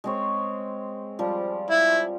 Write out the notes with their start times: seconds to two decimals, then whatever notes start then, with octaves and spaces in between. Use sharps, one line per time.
0.04 G#3 C4 C#5
1.19 F3 G3
1.70 E4